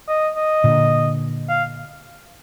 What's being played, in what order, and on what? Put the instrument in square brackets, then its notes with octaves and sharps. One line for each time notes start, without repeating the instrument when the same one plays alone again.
[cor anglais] D#5
D#5
[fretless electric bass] A#2 D3
[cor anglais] F5